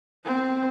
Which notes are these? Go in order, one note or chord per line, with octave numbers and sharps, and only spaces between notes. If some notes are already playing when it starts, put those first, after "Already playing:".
C4